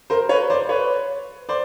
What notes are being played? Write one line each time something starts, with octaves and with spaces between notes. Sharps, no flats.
A#4 C5
B4 C#5
C5 D5
B4 C#5
C5 D5